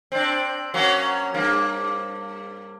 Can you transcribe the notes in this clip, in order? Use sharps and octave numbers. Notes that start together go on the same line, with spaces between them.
C4 D4
F#3 A#3 C#4
G2 A#3